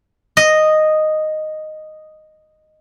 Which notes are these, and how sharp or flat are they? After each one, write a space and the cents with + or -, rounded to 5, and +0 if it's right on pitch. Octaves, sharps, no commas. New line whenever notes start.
D#5 -5